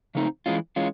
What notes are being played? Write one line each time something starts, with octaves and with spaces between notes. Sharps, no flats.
C#3 F3 A3 C4 D#4
E3 G#3 C#4 F4
E3 G#3 C#4 F4